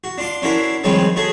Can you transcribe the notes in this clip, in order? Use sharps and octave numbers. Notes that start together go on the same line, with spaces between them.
F#4
D4 F4 C6 D6
C#4 D4 E4 F#4 A#4 C5
D#3 F3 G3 G#3 C4 C#4
A3 F#4 G#4 C#5 A5